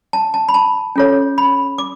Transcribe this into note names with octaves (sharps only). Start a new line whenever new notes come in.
A5
A5
B5
A5
C#4 F4 A4 C#5
B5
D6